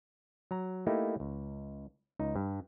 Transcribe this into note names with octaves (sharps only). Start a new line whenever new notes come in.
F#3 A#5
A3 A#3 D#4 E4 G4
C#2
C#2 D#4
G2